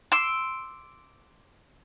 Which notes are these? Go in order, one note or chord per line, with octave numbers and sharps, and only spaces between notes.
C6 D6 E6